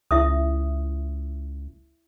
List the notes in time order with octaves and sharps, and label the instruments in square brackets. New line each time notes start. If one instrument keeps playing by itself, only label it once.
[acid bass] C#2 [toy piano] E4 E5 D#6